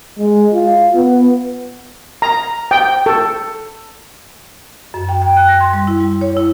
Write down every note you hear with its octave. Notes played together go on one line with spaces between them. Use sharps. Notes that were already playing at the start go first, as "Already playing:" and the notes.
G#3
F4
B3
A#5
G5
A4
F#2
G5
G5
F#6
A#6
C6
G3
E4
G3
C#5
E4